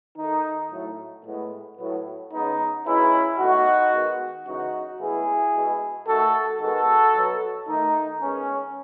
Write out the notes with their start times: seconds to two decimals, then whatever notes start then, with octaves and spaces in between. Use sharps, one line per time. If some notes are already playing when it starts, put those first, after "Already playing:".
0.17 D#3 A3 D#4
0.71 A2 F#3 A3
1.25 A2 G#3 B3
1.78 A2 F#3 B3
2.32 C#3 G#3 B3 D#4
2.85 B2 G#3 B3 C#4 E4
3.38 B2 A3 D#4 F#4
3.93 D#3 G#3 B3
4.46 C#3 E3 G#3 D#4 F#4
4.99 A2 E3 G#3 B3 E4 G#4
5.53 B2 G#3 B3
6.07 D#3 A3 F#4 A4
6.60 D#3 G#3 B3 F#4 A4
7.14 B2 F#3 B3
7.67 D#3 A3 D#4
8.21 D#3 G#3 B3 C#4